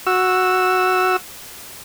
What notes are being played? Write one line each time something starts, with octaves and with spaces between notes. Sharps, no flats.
F#4 E6